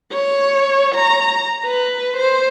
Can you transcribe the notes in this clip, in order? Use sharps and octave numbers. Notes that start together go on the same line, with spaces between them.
C#5
A#5
B4
C5